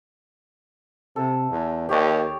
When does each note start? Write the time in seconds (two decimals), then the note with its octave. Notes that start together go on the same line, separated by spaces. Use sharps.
1.16 C3 A4
1.50 E2
1.89 D#2 G4 C#5 D5